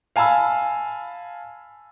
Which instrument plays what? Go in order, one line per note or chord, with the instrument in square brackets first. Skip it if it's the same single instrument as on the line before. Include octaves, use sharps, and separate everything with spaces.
[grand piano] F5 G#5 A5 B5 E6